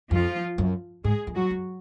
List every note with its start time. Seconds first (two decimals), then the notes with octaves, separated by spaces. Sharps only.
0.11 F2 F3 F4
0.58 F#2
1.04 G#2 G#3 G#4
1.27 F2
1.35 F#3 F#4
1.50 F#2